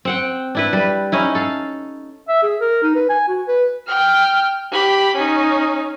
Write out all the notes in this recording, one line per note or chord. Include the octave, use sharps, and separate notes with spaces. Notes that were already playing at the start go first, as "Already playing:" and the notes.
C4 F#5 G5
D4 E4 B4
G3 B4
C#4 D#4 E4
A4 F5
E5
G#4
A#4
D#4
B4
G#5
F#4
B4
G5 F6
G4 B5
C#4 D#4